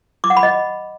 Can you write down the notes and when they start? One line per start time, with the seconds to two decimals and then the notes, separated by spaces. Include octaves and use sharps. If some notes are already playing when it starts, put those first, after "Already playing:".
0.24 D6
0.30 F#5
0.37 B5
0.43 D#5